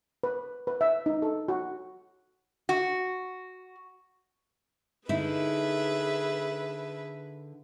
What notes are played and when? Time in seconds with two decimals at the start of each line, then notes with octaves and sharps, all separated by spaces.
0.23 B4
0.67 B4
0.81 E5
1.06 D#4
1.22 A4
1.48 F#4
2.69 F#4
5.09 D3 D#4 E4 G#4 B4 E5